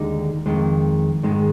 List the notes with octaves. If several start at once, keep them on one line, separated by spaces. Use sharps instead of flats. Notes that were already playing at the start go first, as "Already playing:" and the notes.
Already playing: D#2 D3 G#3 D#4
F2 D#3 G#3
G#2 D#3 G#3